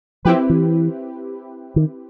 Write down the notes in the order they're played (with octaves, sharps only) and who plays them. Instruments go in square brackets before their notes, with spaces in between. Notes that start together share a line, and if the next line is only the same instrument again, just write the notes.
[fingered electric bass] F3 [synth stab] C4 E4 G4 B4
[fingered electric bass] E3
D#3